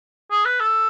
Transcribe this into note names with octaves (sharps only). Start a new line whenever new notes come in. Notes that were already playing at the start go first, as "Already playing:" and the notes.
G#4
B4
A4